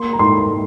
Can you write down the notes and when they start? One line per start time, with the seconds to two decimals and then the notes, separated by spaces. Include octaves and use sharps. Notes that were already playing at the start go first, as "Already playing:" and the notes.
Already playing: A#3 C6
0.13 A#5
0.19 G#2 C6